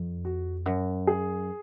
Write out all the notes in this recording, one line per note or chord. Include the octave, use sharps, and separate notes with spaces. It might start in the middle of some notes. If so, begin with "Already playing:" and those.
Already playing: F2
F#4
F#2
G#4